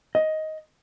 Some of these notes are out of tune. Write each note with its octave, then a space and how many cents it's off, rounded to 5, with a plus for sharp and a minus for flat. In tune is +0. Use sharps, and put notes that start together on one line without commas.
D#5 +10